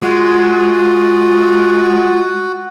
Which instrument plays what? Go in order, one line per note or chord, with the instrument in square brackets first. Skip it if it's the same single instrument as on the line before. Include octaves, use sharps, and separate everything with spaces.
[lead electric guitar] G#3 [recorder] F4 [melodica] F#4